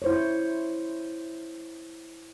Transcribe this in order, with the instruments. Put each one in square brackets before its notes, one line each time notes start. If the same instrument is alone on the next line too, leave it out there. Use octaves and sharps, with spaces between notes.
[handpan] E4 C5 C#5